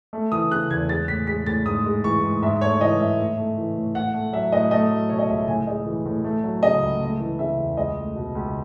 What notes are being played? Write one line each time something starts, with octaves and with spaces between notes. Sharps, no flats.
A3
E3 D#6
C#3 F#6
E2 G#6
G#3 A6
A2 B6
G#3 B6
A2 A6
G#2 D#6
G#3
E3 C#6
G#2
G#2 E5
A3 C#5
E3 D#5
G#2 E5
A2
A3
E3
A2
A2 F#5
A3
F#3 E5
A2 D#5
A3 D#5
F#3
B2 C#5
D#5
C#2 E5
A2 G#5
G#3 D#5
E3
A2
A3
F#3
C#3 D#5
C#2
A3
E3
C#3 E5
E2
C#2 D#5
A3
B2
C#2